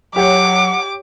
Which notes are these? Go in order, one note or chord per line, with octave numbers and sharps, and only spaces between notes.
F#3 G4 C#5 F#5 D6